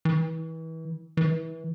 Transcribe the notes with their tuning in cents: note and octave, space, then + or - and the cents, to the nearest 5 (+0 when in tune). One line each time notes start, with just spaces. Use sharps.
E3 -30
E3 -25